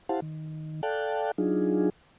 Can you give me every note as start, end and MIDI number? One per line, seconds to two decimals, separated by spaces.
0.09 0.20 64
0.09 0.20 67
0.09 0.20 72
0.09 0.20 77
0.09 0.20 78
0.09 0.20 81
0.22 0.81 51
0.83 1.31 69
0.83 1.31 74
0.83 1.31 77
0.83 1.31 79
0.83 1.31 81
0.83 1.31 90
1.38 1.90 54
1.38 1.90 62
1.38 1.90 63
1.38 1.90 65
1.38 1.90 68